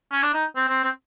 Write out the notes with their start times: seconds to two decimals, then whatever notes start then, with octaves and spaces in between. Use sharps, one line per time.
0.13 C#4
0.23 D4
0.34 D#4
0.56 C4
0.69 C4
0.84 C4